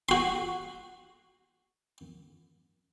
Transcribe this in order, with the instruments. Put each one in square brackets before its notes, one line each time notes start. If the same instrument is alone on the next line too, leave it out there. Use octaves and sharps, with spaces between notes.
[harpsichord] F#4 C6